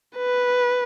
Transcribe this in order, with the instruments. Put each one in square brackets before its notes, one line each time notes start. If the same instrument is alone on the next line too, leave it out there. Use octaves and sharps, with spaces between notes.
[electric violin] B4